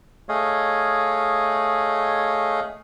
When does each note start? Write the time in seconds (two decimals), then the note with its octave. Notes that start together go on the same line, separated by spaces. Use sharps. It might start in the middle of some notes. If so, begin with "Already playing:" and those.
0.29 A3 G#4 C#5 D#5 F5